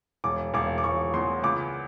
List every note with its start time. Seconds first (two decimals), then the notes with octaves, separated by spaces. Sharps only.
0.24 E1 D6
0.54 E1 D6
0.78 D6
0.84 E1 C#6
1.14 E2 C6
1.43 C#2 D6